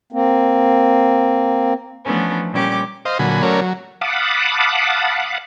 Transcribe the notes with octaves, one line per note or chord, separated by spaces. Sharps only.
A#3 C4
E3 F3 A3 B3 C#4 D4
A#2 G3 C#4 G4 D6
C5 D#5 F5
A#2 D3 F#3 G#5 B5
F#3 A3 C#4 A#4 C#5 D5
F#3
F5 F#5 A5 B5 D6 D#6